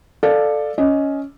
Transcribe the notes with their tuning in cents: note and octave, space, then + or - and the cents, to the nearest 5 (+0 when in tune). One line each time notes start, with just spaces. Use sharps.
A4 +0 D5 +15 F5 +0
C#4 +10 D#5 +5